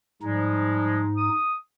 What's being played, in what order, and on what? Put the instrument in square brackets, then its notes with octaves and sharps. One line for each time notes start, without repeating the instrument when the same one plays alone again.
[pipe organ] G#2 D#4 [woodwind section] F3 G3 G#3
[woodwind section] D#6